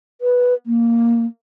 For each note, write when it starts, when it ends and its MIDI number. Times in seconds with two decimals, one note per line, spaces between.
0.21 0.54 71
0.66 1.26 58